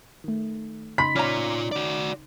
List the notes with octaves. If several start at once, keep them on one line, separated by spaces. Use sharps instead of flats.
D#3 A3
C#3 D#4 B5 C6 B6
C#4 F4 D5 A#5
F#4 D5